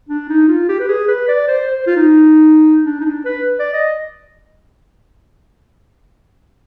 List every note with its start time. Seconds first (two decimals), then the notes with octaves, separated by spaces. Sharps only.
0.09 D4
0.29 D#4
0.48 F4
0.69 G4
0.80 B4
0.88 G#4
1.08 B4
1.28 D5
1.48 C5
1.67 C5
1.87 F4
1.96 D#4
2.85 D4
3.00 D#4
3.05 D4
3.25 B4
3.59 D5
3.74 D#5